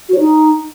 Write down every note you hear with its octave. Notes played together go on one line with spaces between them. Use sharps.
F#4
C#5
D#4